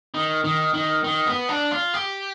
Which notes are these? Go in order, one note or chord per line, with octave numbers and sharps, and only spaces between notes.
D#3
D#3
D#3
D#3
B3
D4
F4
G4